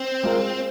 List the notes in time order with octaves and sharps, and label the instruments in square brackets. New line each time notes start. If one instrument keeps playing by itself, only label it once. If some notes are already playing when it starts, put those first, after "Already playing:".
Already playing: [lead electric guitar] C4
[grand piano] G#3 F4 A#4